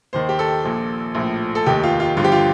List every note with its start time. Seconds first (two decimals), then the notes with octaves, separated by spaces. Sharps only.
0.13 D#2 D#3 C5
0.29 G4
0.39 A4
0.64 A#1 A#2 F3
1.15 A#1 A2 F3
1.55 A4
1.66 F1 D#2 D#3 G4
1.83 F4
2.00 F4
2.17 G1 G2 D3 F3 F4
2.24 G4
2.32 F4